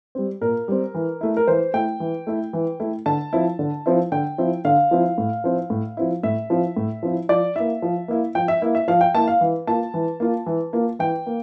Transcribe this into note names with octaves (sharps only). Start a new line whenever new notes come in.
G3 C4
A#2 A#4
G3 C4
E3
A3 E4
A#4
E3 C5
A3 E4 G5
E3
A3 E4
E3
A3 E4
D3 A5
F3 C4 E4
D3
F3 C4 E4
D3 G5
F3 C4 E4
D3 F5
F3 C4 E4
A2
F3 C4 E4
A2
F3 C4 E4
A2 E5
F3 C4 E4
A2
F3 C4 E4
F3 D5
A#3 E4 E5
F3
A#3 E4
F3 G5
E5
A#3 E4
E5
F3 F5
G5
A#3 E4 A5
F5
E3
A#3 F4 A5
E3
A#3 F4
E3
A#3 F4
E3 G5
A#3